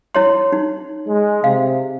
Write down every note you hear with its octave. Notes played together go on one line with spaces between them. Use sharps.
E4 C#5 C6
D#4
G#3
C3 F5